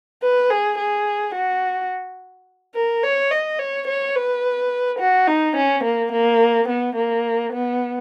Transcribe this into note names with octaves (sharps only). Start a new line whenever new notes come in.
B4
G#4
G#4
F#4
A#4
C#5
D#5
C#5
C#5
B4
F#4
D#4
C#4
A#3
A#3
B3
A#3
B3